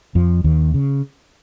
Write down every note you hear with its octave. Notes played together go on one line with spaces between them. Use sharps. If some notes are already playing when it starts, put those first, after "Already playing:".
F2 F3
D#2 D#3
C#3